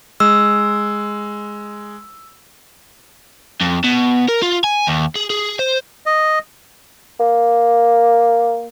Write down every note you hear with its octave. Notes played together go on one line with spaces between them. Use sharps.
G#3 E6
F2
B2
A#4
F4
G#5
D#2
G#4
G#4
C5
D#5
A#3